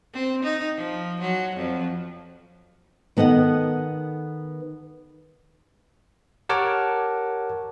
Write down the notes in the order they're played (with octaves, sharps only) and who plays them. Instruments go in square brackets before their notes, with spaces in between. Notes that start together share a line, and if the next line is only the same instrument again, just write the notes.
[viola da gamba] C4
D#4
F3
F#3
F2
[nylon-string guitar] D#3 B3 A4 D#5 F#5
[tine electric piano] G4 A#4 C#5 F#5 A5 D6